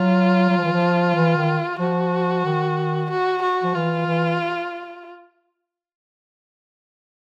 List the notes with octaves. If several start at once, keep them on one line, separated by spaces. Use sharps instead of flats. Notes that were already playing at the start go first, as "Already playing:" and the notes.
Already playing: F#3 F4
F#3
F3
E3
F3
E3
D#3
F3 F#4
D#3
F#4
F#4
F3
E3 F4
E3